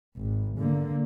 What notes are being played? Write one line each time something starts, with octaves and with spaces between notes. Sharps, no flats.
G#1
D3 A#3